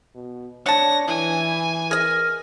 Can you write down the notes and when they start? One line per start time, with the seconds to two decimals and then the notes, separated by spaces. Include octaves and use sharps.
0.15 B2
0.66 D4 C#5 F#5 A5 A#6
1.08 E3 E4 G#5
1.91 G#4 A#4 D#5